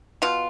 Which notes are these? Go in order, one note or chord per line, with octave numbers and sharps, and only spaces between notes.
B2 F4